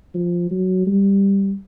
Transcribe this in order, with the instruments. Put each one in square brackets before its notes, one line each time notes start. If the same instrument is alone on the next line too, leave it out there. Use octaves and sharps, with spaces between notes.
[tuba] F3
F#3
G3